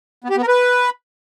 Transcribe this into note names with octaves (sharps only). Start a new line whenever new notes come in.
B3
G4
B3
A#4
B4